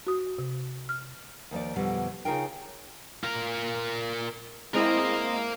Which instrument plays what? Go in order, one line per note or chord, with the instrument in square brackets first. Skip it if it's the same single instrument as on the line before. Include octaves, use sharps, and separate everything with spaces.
[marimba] F#4 D#6
C3
F6
[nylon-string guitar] D#2 F3 D5
F2 B2 D3 F3 G3
C#3 E3 D#4 F4 A#4 G5
[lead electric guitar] F4 A#4
[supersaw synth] G#3 C4 E4 [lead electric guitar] A#4 F5 [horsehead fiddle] C5 D#5